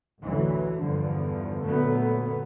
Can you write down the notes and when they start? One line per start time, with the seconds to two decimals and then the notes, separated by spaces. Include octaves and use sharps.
0.22 A1 D2 E3 F#3
0.78 E2 G2 D3 F3
1.64 A#2 D3 F#3 A3 B3